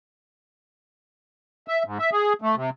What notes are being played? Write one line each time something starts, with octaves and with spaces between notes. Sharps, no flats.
E5
G#2
E5
G#4
A3
C3